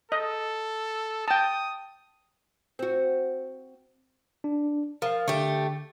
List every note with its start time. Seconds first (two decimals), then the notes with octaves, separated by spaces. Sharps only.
0.12 A4 D#5
1.28 G5 A5 D#6
2.79 C4 F#4
4.44 D4
5.02 F3 A#4 F5
5.28 D3 A3 G4